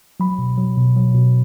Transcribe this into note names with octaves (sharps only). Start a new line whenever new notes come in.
F#3 B5
B2
F#3
B2
F#3
B2